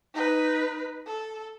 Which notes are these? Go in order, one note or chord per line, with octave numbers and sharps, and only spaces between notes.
D#4 B4
A4